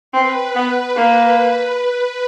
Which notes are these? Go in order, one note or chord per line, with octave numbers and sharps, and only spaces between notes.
C4 B4
B3
A#3